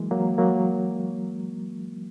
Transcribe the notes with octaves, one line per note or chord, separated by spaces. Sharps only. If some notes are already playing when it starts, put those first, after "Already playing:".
Already playing: E3 F#3 G#3 A#3
F#3 A#3
F#3 A#3